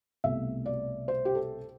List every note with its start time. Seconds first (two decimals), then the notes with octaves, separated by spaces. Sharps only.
0.24 C2 B2 A3 E5
0.66 D5
1.08 C5
1.25 G4
1.35 A4